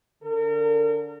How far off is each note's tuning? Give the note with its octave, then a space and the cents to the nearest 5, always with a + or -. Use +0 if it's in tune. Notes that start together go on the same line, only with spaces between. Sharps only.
D3 -25 A#4 -40